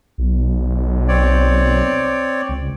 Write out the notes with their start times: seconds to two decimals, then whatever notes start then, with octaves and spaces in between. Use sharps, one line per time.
0.18 B1
1.08 C4 C#5 D5
2.49 C#2